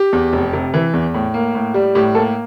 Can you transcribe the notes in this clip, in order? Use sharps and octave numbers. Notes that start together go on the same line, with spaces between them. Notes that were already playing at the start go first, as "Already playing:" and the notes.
Already playing: G4
E2
F1
C3
E3
E2
A2
A#3
A2
G3
A2 G4
A#3 A4